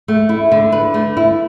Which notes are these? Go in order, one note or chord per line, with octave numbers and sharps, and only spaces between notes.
A3
E4
D3
B4
A3
E4